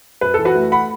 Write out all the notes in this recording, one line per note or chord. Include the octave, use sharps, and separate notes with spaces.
F#2 B4
E3 A4
F#4 B4
A3
F#5 B5